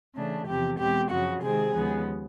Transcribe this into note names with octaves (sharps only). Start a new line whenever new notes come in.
C#3 E3 A3 D4
E2 C3 F3 G4
E2 B2 G#3 C4 G4
F#2 C#3 F3 F#4
C3 D#3 G#3 C4 G#4
D#2 C#3 F3 G#3 B3